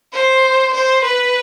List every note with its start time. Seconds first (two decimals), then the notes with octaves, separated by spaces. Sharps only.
0.13 C5
0.74 C5
1.04 B4